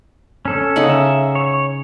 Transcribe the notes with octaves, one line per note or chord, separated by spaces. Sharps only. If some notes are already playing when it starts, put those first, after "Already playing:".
C#4 A4
C#3 D#4 F#5
E5
C#5